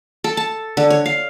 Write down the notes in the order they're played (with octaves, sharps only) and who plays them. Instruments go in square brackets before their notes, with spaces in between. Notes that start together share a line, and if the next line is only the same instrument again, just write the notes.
[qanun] A4
A5
D3
C#5
F5